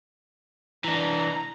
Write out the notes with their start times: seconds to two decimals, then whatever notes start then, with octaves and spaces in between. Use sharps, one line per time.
0.84 E3 D4 A#5